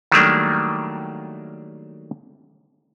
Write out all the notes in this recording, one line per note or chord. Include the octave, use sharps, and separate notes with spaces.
D#3 F#3 G3 A3 A#3 D4